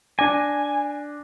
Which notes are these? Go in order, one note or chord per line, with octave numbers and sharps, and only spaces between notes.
D4 G#5 D6 A#6